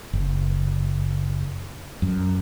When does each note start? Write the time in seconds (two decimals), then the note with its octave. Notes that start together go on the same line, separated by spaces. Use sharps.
0.13 F#1
2.02 F#2